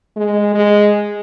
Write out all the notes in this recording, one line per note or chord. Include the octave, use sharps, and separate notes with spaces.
G#3
G#3